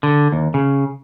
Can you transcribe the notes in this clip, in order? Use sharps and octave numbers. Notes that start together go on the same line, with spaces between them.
D3
D#2
C#3